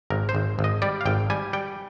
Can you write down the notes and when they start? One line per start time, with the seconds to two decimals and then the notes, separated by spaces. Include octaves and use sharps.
0.10 G#1 A#4
0.29 C5
0.35 G#1
0.59 G#1
0.64 D#5
0.82 G3 D5
1.01 F5
1.06 G#1 G5
1.30 G3 G#5
1.53 G3 G5